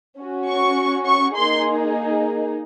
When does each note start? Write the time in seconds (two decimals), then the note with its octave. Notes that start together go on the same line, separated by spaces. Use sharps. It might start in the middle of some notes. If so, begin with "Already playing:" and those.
0.19 C#4 F#4
0.48 C#6
1.06 C#6
1.35 A#3 D#4 G#4 C6